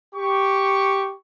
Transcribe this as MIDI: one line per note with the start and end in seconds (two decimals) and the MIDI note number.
0.16 1.14 67
0.16 1.14 85